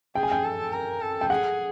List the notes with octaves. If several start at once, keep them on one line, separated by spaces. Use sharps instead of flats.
G#4 G5
G#5
G5
A4
A#4
A4
G5
G#4 F#5